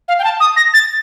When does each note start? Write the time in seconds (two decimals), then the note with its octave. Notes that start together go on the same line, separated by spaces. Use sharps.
0.08 F5
0.19 G5
0.24 A5
0.40 D#6
0.57 A#6
0.74 A6